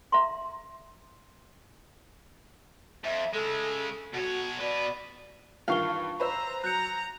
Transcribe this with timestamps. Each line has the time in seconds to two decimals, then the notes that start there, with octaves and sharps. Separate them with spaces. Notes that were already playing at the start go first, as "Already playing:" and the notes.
0.12 E5 A#5 C6
3.04 F2 E5
3.34 C#3 G#3 A4
4.14 B2 F#4 C#5
4.61 B2 B4 D5
5.68 G2 D#3 E3 F4 F5 C#6 G7
6.20 B4 C5 A#5 E6
6.64 F#3 A#5 F#6 G6 C#7